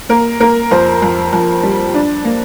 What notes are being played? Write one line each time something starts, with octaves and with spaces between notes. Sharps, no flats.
A#3 A#4
A#3 A#4
F2 C5
F2
F2
G3
D4
A#3